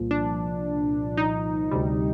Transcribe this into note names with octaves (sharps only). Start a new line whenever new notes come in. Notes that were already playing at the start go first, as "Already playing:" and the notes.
Already playing: C2 A#2 F3
D4
D#4
D2 C3 G3